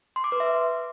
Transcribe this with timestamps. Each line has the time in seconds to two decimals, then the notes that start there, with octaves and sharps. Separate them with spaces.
0.16 C6
0.24 D6
0.32 B4
0.40 E5